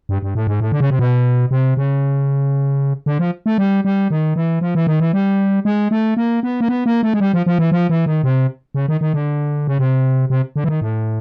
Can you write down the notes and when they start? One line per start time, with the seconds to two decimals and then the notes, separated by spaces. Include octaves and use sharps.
0.09 G2
0.22 G2
0.35 A2
0.47 G#2
0.61 A2
0.72 D3
0.80 C#3
0.90 C3
0.99 B2
1.51 C3
1.77 C#3
3.06 D3
3.19 F3
3.46 A3
3.58 G3
3.85 G3
4.10 D#3
4.36 E3
4.61 F3
4.75 E3
4.87 D#3
5.00 E3
5.13 G3
5.65 G#3
5.91 A3
6.17 A#3
6.43 B3
6.61 A#3
6.68 B3
6.86 A#3
7.03 A3
7.14 G#3
7.20 G3
7.33 F3
7.46 F3
7.59 E3
7.72 F3
7.90 E3
8.06 D#3
8.23 C3
8.75 C#3
8.88 D#3
9.01 D#3
9.14 D3
9.67 C#3
9.79 C3
10.30 C3
10.56 D3
10.64 E3
10.69 D#3
10.82 A2